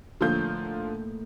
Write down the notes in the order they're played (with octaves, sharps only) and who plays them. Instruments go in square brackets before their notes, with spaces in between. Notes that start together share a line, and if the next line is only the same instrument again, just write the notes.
[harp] A2 A#3 D#4 [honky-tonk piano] D3 F3 G6